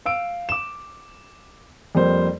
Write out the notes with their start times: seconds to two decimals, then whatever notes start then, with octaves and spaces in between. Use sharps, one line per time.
0.06 F5 E6 D7
0.49 D6 E7
1.95 F2 G3 A#3 C5